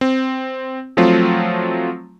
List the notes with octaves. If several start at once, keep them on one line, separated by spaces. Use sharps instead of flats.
C4
F3 F#3 A3 C4 F4